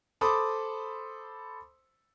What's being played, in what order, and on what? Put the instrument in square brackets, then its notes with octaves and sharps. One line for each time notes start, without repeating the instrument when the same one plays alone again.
[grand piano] A4 C5 B5 C6 D6 D#6